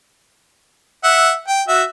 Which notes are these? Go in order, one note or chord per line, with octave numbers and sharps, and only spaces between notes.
E5 F#5
G5
F#4 E5